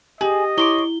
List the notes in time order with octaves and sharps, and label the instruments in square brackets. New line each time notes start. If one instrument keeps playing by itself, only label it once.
[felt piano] G4 [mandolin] G#4 [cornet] D#5
[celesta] E4 G7 [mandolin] C#5 C6 D6